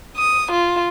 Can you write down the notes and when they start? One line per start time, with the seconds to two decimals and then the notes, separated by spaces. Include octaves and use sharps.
0.17 D#6
0.52 F4